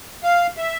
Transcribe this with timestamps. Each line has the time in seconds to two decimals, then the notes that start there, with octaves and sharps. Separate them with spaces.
0.23 F5
0.57 E5